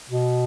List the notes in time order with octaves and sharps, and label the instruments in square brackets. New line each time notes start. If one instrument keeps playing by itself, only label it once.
[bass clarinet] B2